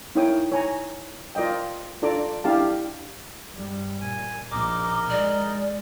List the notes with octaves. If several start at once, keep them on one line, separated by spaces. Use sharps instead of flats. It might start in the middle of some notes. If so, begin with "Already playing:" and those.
D#4 E4 A#4 C#5 G5 D#6
C#5 G#5 A#5
F4 A#4 D5 D#5 G5
D4 F4 A4 D5 A#5 D6
D4 E4 G4 F5 A5
G2 G3
A#2 G#5
A#1 A#2 D#4 A#4 D#5 D6
G#3 D5